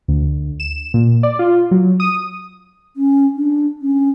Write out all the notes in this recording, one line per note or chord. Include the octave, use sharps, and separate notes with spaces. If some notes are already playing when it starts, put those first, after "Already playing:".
D2
E7
A#2
D5
F4
F#3
D#6
C#4
D4
C#4